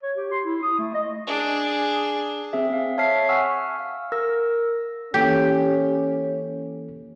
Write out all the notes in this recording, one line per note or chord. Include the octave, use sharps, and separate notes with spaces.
C#5
G4
C6
E4
D#6
A3
D#5
D4 G#4
C4 G#4 E5
C4 F5
C#5 E5 A5 F6 B6 C7
F#5 G#5 C#6 E6 F6
F5
A#4 E6 A#6
E3 A#3 C#4 G4 A4